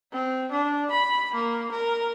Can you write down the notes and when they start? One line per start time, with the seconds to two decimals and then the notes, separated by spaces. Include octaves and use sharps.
0.12 C4
0.51 D4
0.90 B5
1.34 A#3
1.71 A#4